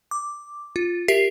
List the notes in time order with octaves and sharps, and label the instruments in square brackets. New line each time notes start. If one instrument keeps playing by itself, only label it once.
[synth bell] D6
F4
G4 A#4 E5 C7